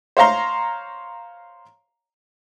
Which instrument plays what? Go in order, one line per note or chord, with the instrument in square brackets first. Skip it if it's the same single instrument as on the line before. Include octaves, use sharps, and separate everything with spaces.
[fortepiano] C5 C#5 F5 A#5 C6